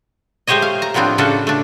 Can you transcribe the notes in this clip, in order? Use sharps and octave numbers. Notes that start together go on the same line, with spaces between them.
G#3 A3 G4 C5 C#5 D#5
F5
A#5
A2 F3 B3 C4 D4
C#3 C#4 D4 F#4 A4
A3 D4